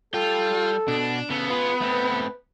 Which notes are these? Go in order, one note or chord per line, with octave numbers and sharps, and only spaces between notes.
G3 F4 A4 G5
B2 D4
C#3 B3 A4
F4 G#4 B4
A3 C4